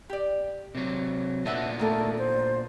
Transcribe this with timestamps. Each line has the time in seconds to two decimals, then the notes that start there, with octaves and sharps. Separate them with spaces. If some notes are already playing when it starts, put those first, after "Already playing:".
0.10 G4 D5
0.75 C3 F#3
1.45 A#2 B3 D4 A4 E5 F#5
1.79 D#3 A3 A#4 D5
2.18 C5